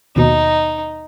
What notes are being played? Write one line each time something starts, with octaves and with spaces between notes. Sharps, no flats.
D#2 B2 D#4